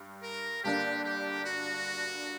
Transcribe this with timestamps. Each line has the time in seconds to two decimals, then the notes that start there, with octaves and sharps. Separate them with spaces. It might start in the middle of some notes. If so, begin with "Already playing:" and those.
Already playing: G2 G4
0.23 A#4
0.64 G2 D3 A#3 D4 G4
1.05 G4
1.46 F#4